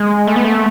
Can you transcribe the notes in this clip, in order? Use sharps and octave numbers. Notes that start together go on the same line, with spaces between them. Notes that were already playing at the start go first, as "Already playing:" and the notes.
Already playing: G#3
A3
B3
A3